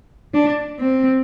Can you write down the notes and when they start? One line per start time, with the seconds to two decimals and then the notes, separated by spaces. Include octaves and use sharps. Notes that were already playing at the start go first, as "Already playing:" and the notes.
0.34 D4
0.79 C4